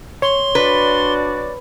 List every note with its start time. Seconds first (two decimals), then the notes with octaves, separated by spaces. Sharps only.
0.22 C#5 C6
0.55 D4 F#4 B4 D5